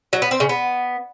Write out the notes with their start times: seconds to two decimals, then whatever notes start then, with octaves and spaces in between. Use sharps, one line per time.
0.13 F#3
0.22 B3
0.31 C4
0.40 C#3
0.49 B3